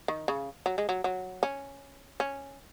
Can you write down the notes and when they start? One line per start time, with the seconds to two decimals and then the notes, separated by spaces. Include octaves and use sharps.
0.08 D#3
0.28 C#3
0.66 F#3
0.78 G#3
0.89 F#3
1.04 F#3
1.43 C#4
2.20 C#4